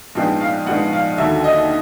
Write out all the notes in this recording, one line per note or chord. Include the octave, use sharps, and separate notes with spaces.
A#1 G#2 F3 G#3 B3 G5
F5
A#1 G#2 F3 G#3 B3 F#5
F5
D#2 D3 F#3 E5
D#5